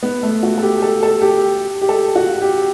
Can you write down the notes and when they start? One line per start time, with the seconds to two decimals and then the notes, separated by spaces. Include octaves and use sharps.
0.03 B3
0.23 A3
0.43 F#4
0.58 A4
0.62 G4
0.82 A4
1.03 A4
1.22 G4
1.82 G4
1.89 A4
2.15 F#4
2.42 G4